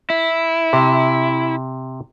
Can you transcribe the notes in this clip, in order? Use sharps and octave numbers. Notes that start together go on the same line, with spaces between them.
E4
C3